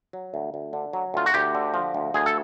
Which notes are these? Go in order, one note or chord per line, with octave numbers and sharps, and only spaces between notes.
F#3
D2
D2
D3
F#3
D2 F4
F#4
D2 G4
D3
F3
D2
D2 G#4
A4